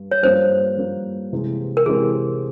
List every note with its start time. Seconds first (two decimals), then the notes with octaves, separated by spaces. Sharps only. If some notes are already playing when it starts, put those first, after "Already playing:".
Already playing: G2
0.11 C#5
0.23 G2 F3 A#3 C5
0.77 G2 F3 A#3
1.32 C3 E3 G#3 C4 G4
1.77 A#4
1.86 C3 E3 G#3 C4 G4 G#4